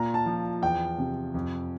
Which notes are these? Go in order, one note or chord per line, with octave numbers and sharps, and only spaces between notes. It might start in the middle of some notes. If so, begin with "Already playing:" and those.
Already playing: A#2 A#5
A5
F3
E2 G5
C3
F2